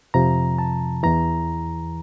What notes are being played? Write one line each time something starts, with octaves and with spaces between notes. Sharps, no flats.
F2 C3 F3 A#5
A5
E2 E3 A#5